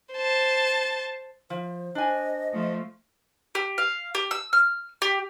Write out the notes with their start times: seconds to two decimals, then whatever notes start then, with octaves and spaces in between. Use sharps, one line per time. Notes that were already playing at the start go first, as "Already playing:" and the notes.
0.13 C5 A5
1.50 F3 C5
1.95 D4 D#5 G#5
2.53 F3 A3
3.55 G4
3.78 F5
4.15 G4
4.31 E6
4.53 F6
5.02 G4